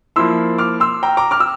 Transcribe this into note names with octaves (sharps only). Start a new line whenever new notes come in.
F3 A#3 E4 C6 E6
D6 F6
C6 E6
G5 A#5
A#5 D6
D6 F6
E6